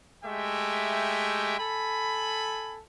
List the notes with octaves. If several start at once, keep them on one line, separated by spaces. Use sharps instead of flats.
G#3 A3 G4 E5 G5
A4 G#5 B5